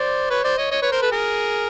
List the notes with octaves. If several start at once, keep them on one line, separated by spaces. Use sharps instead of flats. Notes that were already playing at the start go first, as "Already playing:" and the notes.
Already playing: C5 D5
B4 C#5
C5 D5
C#5 D#5
C#5 D#5
B4 C#5
A#4 C5
A4 B4
G#4 A#4